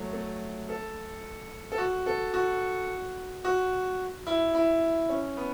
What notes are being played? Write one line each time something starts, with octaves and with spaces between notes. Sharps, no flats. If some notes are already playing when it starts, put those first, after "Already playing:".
Already playing: F#3 A3
A3
A4
A4
F#4
A4
F#4
F#4
E4
E4
C#4
B3